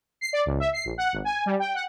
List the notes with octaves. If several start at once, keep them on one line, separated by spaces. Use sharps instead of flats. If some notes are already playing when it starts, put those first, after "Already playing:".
C7
D5
C#2
E5
C7
A#1
F#5
G#1
G#5
G3
G5
F#5